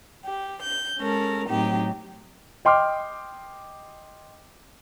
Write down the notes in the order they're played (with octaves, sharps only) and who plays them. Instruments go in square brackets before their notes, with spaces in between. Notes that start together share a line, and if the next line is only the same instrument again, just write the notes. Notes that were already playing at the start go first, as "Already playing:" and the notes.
[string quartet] G4
G6
G#3 C#4 A4 A#4
A2 F#3 C4 D#4 G4
[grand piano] D#5 G5 C6 D6 F6